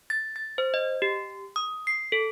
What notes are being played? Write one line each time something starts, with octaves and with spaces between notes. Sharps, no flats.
A6
A6
C5
D#5
G4
D#6
C7
A4